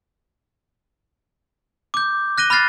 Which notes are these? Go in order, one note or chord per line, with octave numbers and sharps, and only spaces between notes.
D6 G6
F#6 A#6 D#7 G7
B5 F6 F#6 A6 C7